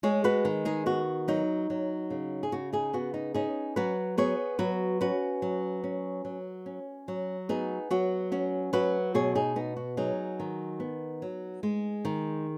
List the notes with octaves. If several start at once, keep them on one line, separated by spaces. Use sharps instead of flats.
G#3 G#4 C#5
F#4 B4
D#3
D#4 G#4
B3 F#4
F#3 D#4
F#3
C#3
G#4
C#3 F#4
D#4 G#4
B3 F#4
D#4
C#4 D#4 G#4
F#3 F#4 B4
B3 G#4 C#5
F#3 F#4 B4
C#4 F#4 B4
F#3
C#4
F#3
C#4
F#3
B3 D#4 G#4
F#3 F#4
C#4 F#4
F#3 F#4 B4
B2 G#4 C#5
D#4 G#4
B3 D#4
F#4
F#3 D#4 G#4
D#3
B3
F#3
G#3
D#3